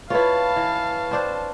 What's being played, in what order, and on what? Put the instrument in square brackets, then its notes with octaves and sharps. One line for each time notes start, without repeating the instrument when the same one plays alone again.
[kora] E4 F4 [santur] B4 C#5 [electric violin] F5 A5
[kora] E3
C4 D4 C5